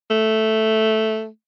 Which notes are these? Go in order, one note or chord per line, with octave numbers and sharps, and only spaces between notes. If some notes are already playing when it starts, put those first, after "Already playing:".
A3